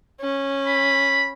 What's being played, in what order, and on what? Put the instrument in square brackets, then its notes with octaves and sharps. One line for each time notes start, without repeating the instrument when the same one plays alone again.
[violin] C#4
[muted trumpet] B5